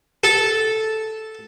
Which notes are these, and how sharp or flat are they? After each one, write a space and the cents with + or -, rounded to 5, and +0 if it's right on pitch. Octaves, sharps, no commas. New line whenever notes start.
A4 -5